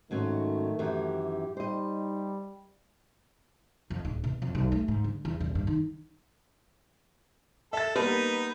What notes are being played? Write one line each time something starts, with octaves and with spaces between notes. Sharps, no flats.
G#2 D#3 F#3 A3 C#4
F#2 D#3 E3 G4
G3 D#4 C5 D#5
F2
D1
B2
F2
B1
A3
G#2
D3
E2
D#1
G2
D#3
A4 E5 A6
G3 A#3 B3 D#4 B4